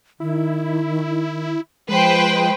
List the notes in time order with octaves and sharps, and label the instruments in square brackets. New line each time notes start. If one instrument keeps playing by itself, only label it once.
[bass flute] D#3 [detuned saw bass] E4
[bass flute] F3 [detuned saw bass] G#3 [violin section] B4 C5 G5